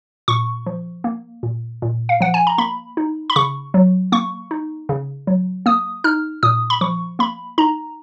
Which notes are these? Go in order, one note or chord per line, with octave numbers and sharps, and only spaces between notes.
A#2 C#6
F3
A#3
A#2
A#2
F5
F3 F#5
G#5
A#5
A#3 B5
D#4
B5
C#3 C#6
F#3
A#3 C#6
D#4
C#3
F#3
A#3 D#6
D#4 F6
A#2 D#6
B5
F3 C#6
A#3 B5
D#4 A#5